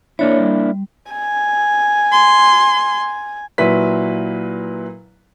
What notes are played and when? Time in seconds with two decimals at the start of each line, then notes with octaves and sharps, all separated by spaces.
0.19 A#3 D4 E4 C#5
0.37 G3
1.11 G#5
2.12 C6
3.58 A#2 F#3 E4 B4 B6